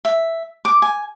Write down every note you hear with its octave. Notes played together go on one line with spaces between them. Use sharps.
E5
D6
G#5